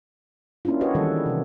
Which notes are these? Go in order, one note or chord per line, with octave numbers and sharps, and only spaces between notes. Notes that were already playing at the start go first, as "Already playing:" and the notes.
A#3 C#4 D4 E4 F4
F#4 G4 B4 C#5 D#5
D#3 E3 G3 G#3 A4
C3 E3